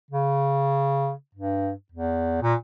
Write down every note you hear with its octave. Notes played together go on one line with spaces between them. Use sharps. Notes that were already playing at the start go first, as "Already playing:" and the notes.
C#3
G2
E2
A#2